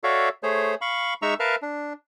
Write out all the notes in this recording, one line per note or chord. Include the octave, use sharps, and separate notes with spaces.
F#4 A4 C#5 D5 E5 F5
A3 G#4 C5 C#5
F5 B5 C#6
G#3 D#4 E5 A#5 C#6 E6
A#4 B4 E5 F5 A5 F6
D4